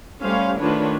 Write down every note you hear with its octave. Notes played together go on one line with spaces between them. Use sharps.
G3 A3 C#4 C5 F5
D#3 A3 D4 F4 B4 C#5